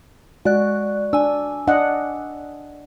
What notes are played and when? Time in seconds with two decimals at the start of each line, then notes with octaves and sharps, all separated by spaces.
0.45 G#3 F#4 D5 F#6
1.13 D4 G#5 E6
1.67 D4 D#5 F#5